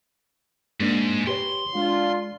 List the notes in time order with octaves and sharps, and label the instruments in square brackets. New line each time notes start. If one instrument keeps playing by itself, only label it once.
[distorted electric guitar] G#2 [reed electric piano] G#3 A#3 D4
[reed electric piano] G4 B4 C#5 [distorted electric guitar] C6
[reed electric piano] G#3 [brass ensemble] D4 F4